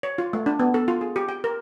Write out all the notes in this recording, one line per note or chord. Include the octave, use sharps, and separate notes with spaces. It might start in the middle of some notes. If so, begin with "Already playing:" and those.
C#5
F4
A3
D4
B3
A4
F4
G#4
G4
G5
A#4